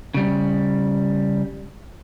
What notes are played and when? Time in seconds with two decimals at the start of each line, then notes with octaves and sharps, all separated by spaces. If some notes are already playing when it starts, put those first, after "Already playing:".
0.14 C#3 G3